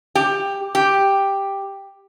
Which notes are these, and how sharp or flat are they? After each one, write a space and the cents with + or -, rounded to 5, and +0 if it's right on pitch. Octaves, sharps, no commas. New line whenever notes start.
G4 +15
G4 +5